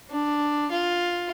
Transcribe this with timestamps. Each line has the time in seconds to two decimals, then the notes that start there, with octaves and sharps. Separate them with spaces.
0.11 D4
0.71 F4